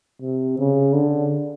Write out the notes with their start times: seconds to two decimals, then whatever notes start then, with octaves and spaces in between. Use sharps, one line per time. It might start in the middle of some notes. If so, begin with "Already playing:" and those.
0.22 C3
0.58 C#3
0.93 D3